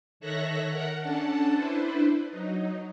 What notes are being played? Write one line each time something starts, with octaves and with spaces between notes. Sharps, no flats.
D#3 A4 C#5 E5 F#6 A#6
A#4 F#5 A#5
C#4 D4 A4 F#5 A5
D4 E4 B4 C5
F#3 D#4